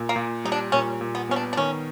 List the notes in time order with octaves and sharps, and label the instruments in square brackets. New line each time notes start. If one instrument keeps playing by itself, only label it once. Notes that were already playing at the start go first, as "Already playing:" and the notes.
Already playing: [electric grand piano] A#2
[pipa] A#3
[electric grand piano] A#2
[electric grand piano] G3 [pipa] D#4
[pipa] D4
[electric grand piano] A#2 [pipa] C#4
[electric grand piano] A#2
[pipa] B3
[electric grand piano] B3 [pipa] C#4
[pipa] D4
D4
[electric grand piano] D#3 [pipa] C#4